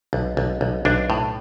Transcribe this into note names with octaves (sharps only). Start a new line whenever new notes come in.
B1
B1
B1
B1 D4
A2